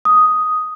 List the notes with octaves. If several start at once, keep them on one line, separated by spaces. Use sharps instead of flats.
D#6